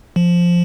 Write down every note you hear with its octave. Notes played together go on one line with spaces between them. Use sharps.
F3